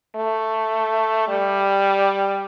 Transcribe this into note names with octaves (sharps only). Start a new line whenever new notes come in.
A3
G3